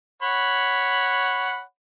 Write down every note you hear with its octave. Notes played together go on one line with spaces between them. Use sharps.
C#5 F#5 B5